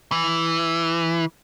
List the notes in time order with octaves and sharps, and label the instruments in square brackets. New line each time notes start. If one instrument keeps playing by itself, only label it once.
[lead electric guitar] E3